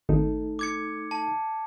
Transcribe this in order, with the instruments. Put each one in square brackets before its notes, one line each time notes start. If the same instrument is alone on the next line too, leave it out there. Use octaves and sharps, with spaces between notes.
[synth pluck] G#1 [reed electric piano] A3 D#4 A4
[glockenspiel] D6 G#6 C#7
A5